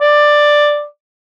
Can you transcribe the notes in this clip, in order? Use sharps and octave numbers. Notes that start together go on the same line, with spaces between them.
D5